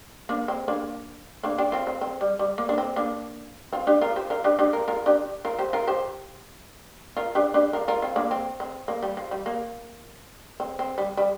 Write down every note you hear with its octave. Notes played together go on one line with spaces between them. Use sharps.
A#3 D4
C4
A#3 D4
A#3 D4
D4 G4
C4 F4
C4
C4
G3
G3
A#3
D4
C4
A#3 D4
C4 F4
D4 G4
F4 A#4
G4 C5
F4 A#4
D4 G4
D4 G4
F4 A#4
F4 A#4
D4 G4
F4 A#4
G4 C5
F4 A#4
G4 C5
F4 A#4
D4 G4
D4 G4
F4 A#4
F4 A#4
C4 F4
A#3 D4
C4
C4
A#3
G3
F3
G3
A#3
C4
C4
G3
G3